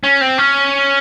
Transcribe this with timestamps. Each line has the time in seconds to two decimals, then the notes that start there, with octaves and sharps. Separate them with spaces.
0.04 C#4
0.21 C4
0.38 C#4